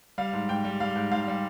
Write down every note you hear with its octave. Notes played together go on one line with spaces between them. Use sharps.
G3 F5
G#2
G#2 G5
G3
G3 F5
G#2
G#2 F5
G3